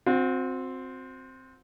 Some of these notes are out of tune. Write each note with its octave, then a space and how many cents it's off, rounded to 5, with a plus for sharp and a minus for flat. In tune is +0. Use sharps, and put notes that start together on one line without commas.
C4 +0 F#4 -40